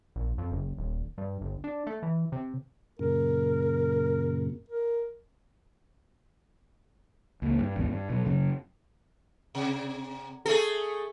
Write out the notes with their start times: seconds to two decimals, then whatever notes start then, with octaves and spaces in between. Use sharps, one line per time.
0.16 A#1
0.38 F2
0.51 F#1
0.78 D#1
1.18 G2
1.41 G1
1.64 D4
1.87 A3
2.02 E3
2.32 C3
2.99 F#2 A#2 C#3 A#4
4.69 A#4
7.42 C#2 A#3
7.59 G2
7.77 G#1 D#2 G#2 B3
7.91 G2
8.10 B2 F#3
8.25 F#1 C#3 F#3
9.55 C3
10.46 A3 G#4 A4